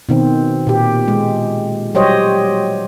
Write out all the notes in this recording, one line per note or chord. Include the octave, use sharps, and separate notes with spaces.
B2 D#3 C4
A#2 G4
G#3
F#3 G3 G4 C5 C#5 D#5